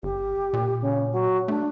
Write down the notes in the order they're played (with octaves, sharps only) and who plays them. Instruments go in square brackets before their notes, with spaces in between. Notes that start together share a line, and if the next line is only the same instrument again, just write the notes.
[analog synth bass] G1 [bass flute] G4
[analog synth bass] A#2
[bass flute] C#3
F#3
[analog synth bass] A3 [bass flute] D4